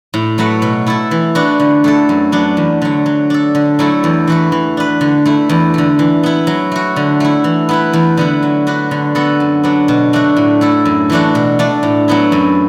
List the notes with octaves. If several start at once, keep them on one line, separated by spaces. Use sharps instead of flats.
A2
F#3 A3 F#4 B4
B2
A3 E4 A4
E3
B3 D4 F#4
D3
A3 E4 A4
F#2
F#3 B3 D4
E2
D3 F#3
F#3
D4 A4
D3
F#3 A3 E4 A4
E2
E3 A3 F#4 B4
E3
D4 B4
D3
A3 E4
E2
D3 A3
E3
B3 E4
F#3
A3 F#4
D3
A3 E4
E3
B3 E4 B4
E2
D3 B3 E4
F#3
D4 F#4 B4
D3
B3 F#4 A4
F#2
F#3 B3 D4
B2
A3 D4 F#4
A2
A3 E4 A4
F#2
E3 A3 D4 F#4
B2
A3 D4
A2
F#3 B3 E4
F#2